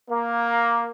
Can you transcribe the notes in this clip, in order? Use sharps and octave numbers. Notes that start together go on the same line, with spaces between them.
A#3